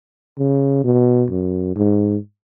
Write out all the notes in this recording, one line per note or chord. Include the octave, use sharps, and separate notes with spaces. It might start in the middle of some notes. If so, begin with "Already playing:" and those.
C#3
B2
F#2
G#2